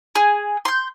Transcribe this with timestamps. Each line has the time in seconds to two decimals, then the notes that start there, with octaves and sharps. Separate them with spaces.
0.15 G#4
0.65 C6 G6